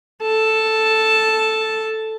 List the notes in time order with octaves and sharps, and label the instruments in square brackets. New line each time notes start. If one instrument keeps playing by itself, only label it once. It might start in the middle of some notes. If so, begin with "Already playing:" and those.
[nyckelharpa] A4 A5